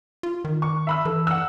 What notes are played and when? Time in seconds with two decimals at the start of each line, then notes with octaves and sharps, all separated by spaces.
0.23 F4
0.45 D#3
0.62 C#6
0.87 E5 B5 E6
1.05 E3 A4
1.27 F#5 E6